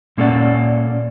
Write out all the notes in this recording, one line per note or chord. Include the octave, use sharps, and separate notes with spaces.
A#2 A#3 C#4 A4 D5 F#5